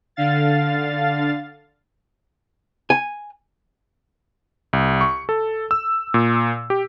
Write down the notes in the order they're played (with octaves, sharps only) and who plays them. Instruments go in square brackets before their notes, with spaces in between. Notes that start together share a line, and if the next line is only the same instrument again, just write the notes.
[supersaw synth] D3 F5 A6
[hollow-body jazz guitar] G#5
[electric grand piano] C2
C#6
A4
E6
A#2
G4